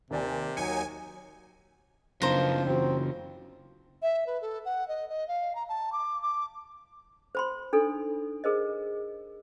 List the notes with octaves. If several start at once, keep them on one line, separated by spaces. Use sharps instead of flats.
D#2 C3 D5 G#5
D#2 F#3 D#4 G#5 C#7
F#2 C#3 F3 B3 D4 D#4 C5 A#5
E3 C4 F4 F#4
E5
B4
A4
F#5
D#5
D#5
F5
A#5
A5
D6
D6
C5 B5 C6
D4 D#4 A4
G#4 A#4 C5 D#5